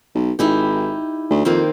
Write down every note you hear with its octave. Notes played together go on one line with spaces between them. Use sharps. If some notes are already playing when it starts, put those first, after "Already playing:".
B1
G#1 D#4 E4 G4
D2
F2 D#3 A#3 C4